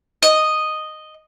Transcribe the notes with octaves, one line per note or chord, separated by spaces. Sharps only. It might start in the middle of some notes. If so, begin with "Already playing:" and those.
D#5